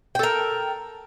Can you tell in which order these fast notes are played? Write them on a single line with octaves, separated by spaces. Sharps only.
G5 A4 A#4